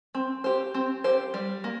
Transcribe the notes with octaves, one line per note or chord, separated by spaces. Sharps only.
C4
G4 C5
C4
G4 C5
G3
A#3